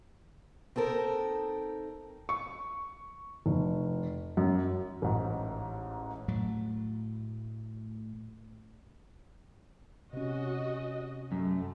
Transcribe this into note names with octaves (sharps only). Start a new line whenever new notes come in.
C4 D#4 A4 A#4
C#6
F1
F#2
A1 G#2
A2 F#3 A3
C3 C#4 F#4 D#5
F#2 A3